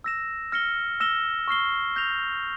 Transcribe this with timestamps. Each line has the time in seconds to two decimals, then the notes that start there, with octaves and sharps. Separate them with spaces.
0.04 E6 A#6 E7
0.52 F6 A#6 C#7 G7
1.00 E6 A#6 E7 G7
1.48 C#6 F6 C7 G7
1.96 G6 A#6 F7